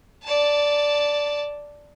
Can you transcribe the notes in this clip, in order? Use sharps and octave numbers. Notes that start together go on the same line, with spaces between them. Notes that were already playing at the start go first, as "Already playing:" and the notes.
D5 A5